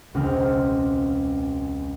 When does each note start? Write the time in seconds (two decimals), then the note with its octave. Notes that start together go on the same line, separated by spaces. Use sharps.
0.14 E1 C#2 C4 F#5 D#6 F6